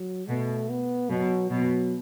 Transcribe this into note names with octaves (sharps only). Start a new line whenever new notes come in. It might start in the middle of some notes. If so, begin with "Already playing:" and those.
Already playing: F#3
B2 A3
B3
B2 F#3
B2 F#3